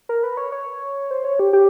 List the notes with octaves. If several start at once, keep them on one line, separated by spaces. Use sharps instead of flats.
A#4
B4
C#5
C#5
C5
C#5
G4
G4